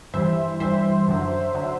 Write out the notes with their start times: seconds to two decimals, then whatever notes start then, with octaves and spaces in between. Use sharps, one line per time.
0.14 G2 E3 G3 C5 E5
0.60 G2 E3 G3 C5 E5
1.08 F#2 D3 F#3
1.55 D3 F#3